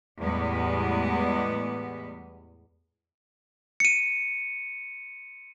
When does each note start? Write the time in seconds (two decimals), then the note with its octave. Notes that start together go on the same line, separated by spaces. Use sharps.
0.21 E2 A2 G3 G#3 B3
3.80 C#7 D#7